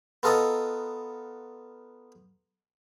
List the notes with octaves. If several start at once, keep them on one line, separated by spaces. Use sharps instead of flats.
B3 F4 A4 D#5 A#5